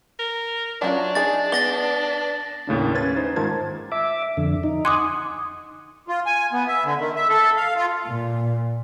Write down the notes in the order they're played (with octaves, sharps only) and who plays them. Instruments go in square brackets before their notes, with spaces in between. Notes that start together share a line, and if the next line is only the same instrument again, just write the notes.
[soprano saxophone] A#4
[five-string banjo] F#3 C#4 F4 [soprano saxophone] D4
[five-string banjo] D#4 G#4 [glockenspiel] A6
[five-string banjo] B3 [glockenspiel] A6 A#6 G7
[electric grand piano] D#2 A2 C#3 D4
C#4 B4 G#6 A6
D#4 C5
G#2 D#3 F4 A5 G#6
[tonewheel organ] E5 D6
F2 D3
D#4
[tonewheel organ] F#5 G#5 [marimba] C6 D6 D#6
[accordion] F4
G#5
B3
E5
D3
D#3
E5
A4
F5
F4
[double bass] A#2